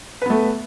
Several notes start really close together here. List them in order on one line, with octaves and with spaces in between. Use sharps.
B4 B3 A3